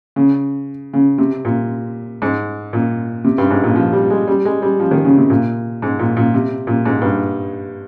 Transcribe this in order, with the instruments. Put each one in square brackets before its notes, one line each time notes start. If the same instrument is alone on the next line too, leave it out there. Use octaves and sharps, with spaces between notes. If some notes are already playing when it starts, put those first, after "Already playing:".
[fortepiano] C#3
C#3
C3
A#2
G#2
A#2
C3
G2
G#2
A#2
F3
G3
G#3
G3
G#3
G3
F3
D#3
C#3
C3
A#2
G#2
A#2
A#2
C3
A#2
G#2
G2